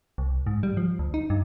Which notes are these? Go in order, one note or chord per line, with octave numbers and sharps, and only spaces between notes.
C2
G#2
G3
F3
D2
D#4
G2